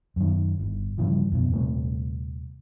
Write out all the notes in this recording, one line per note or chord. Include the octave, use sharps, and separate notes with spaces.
F#2 D#3
G1
G2 C#3 E3 F3
F2 B2
D#1 C3 A3